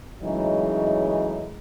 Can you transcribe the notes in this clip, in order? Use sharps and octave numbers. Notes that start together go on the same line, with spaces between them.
C#3 E3 F#3 G#3 A3 D#4